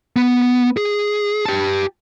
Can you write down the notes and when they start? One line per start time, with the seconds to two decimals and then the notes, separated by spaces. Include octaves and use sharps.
0.16 B3
0.77 G#4
1.45 G4 A5